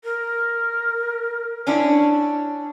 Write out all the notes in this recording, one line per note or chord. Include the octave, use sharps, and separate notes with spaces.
A#4
C#4 D4 E4